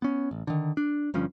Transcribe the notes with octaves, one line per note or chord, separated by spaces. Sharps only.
B3 C#4
A1
D3 D#3
D4
G1 G2 F3 C#4